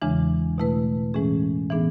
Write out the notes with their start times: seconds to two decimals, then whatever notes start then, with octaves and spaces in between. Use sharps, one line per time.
0.02 E2 C#3 E3 G#3 D4
0.58 B2 A3 E4 B4
1.14 A2 E3 G#3 C#4 G#4
1.70 A2 E3 B3 D4 G#4